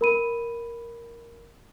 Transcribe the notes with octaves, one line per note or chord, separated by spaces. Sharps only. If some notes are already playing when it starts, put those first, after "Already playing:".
A#4 B5 D#7